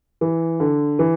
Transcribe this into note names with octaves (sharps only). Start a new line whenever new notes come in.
E3
D3
E3